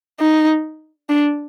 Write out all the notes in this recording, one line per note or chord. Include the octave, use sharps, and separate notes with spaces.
D#4
D4